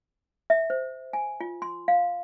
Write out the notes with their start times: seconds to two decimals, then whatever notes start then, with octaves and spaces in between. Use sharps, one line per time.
0.50 E5
0.70 C5
1.13 G#5
1.41 F4
1.62 C6
1.88 F5